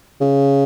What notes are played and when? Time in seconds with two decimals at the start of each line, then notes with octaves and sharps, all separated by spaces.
0.21 C#3